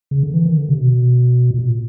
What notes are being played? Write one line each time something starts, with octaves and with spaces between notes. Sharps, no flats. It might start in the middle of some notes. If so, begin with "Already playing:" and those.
C#3
D3
E3
D#3
D3
C3
B2
A#2
B2
A#2